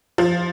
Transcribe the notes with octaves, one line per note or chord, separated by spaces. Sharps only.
F3